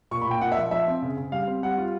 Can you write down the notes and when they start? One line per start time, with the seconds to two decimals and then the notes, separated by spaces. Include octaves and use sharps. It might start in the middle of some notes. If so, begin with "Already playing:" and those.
0.11 A#2 C#6
0.21 B5
0.27 A#2 G5
0.41 A#2 F#5
0.52 E5
0.57 F3
0.71 F3 E5
0.87 C4
1.02 C#3
1.17 C#3
1.32 G3 F5
1.47 C4
1.63 G3 F#5
1.78 F4